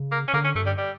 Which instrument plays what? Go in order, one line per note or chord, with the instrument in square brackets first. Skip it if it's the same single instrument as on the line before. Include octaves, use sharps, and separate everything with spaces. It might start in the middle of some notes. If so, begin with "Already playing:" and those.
Already playing: [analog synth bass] C#3
[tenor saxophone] A#3
C#4
[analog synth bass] D3 [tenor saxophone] A#3
[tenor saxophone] C#4
[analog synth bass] G2 [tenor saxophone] A3
[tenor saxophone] G3
G3